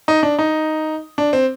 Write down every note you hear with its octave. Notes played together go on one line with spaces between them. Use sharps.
D#4
D4
D#4
D4
C4